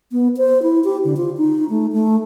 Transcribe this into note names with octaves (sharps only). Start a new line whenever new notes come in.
B3
C5
E4
G4
D3
F4
D#4
A3
A3